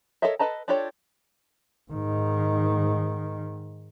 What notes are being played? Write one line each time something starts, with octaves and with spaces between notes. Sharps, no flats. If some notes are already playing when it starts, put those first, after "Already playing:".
A4 A#4 C#5 D#5 E5
A4 B4 D#5 A5 A#5
D4 F4 G4 A4 C#5
G#2 D#3